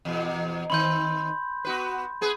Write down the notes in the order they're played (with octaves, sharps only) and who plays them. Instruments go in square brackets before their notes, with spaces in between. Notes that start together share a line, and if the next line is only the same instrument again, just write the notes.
[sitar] E2 B2
[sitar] D#3 C4 [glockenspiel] B5 C6 G6
[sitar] B3 F#4 B4
B3 G#4 B4